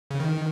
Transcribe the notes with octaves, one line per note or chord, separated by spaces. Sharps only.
C#3
D#3